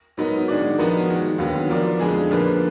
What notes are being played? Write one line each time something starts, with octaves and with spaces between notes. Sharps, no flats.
G#2 F#3 B3 D#4 A#4
D#3 G#3 D4 F#4 D5
F3 B3 D#4 F#4 A#4
G#2 D#3 G#3
D#2 D3 F#3 B3
F3 B3 F4 A#4 D5
F2 D3 G#3 D#4 G#4
D3 F3 A#3 F4 B4